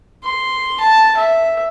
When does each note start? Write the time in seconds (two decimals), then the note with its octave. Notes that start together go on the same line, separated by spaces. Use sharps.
0.24 C6
0.80 A5
1.17 E5